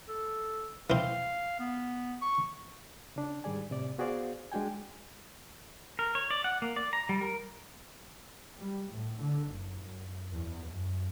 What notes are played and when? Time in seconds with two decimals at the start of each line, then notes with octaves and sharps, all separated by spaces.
0.08 A4
0.90 E3 C4 F5
1.60 B3
2.21 C#6
3.16 C#3 D4
3.44 G#2 D#3 G3 G#4 D5 G#5
3.70 A2 C3 D5
3.98 B3 F#4 G#4 C5 D5 F5
4.52 G#3 D4 F#4 G5 G#5
5.99 A#4
6.15 C#5
6.30 D5
6.44 F#5
6.62 A#3
6.76 D5
6.93 A#5
7.09 G3
7.21 A#4
8.58 G3
8.91 A2
9.20 D3
9.49 F#1
9.83 F#2
10.32 E2
10.68 F#2